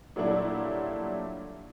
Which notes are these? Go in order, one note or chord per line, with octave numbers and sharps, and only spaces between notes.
A#2 F#3 G3 A3 D4 E4